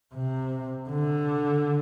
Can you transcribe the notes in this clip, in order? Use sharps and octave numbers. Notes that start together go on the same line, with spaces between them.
C3
D3